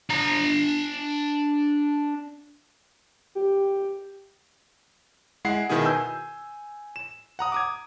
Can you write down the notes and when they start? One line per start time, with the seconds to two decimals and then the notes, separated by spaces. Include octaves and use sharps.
0.10 D4 A#5
3.35 G4
5.45 G#3 E4 F#5 C7
5.69 B2 D#3 B3 E4 G#4
5.85 G#5 E6 G6
6.96 E7
7.39 F#5 A#5 D#6
7.52 D6 D#6 G#6